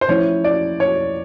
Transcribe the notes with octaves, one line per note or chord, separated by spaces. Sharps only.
C5
F3 A3 C#4 E4 C#5
D5
C#5